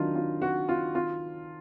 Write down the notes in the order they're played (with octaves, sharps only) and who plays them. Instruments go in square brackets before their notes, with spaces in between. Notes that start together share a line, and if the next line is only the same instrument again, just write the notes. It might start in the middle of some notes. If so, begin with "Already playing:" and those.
Already playing: [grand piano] D#3 F#3 D4 [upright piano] D#4 F4
[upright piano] F4
F#4
F4
F4